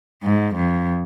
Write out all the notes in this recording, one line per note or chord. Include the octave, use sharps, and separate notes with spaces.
G#2
F2